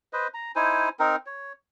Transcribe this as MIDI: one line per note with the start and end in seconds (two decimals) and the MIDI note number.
0.13 0.28 71
0.13 0.28 72
0.13 0.28 75
0.34 0.52 82
0.56 0.89 63
0.56 0.89 64
0.56 0.89 72
0.56 0.89 80
0.99 1.16 60
0.99 1.16 63
0.99 1.16 70
1.26 1.53 73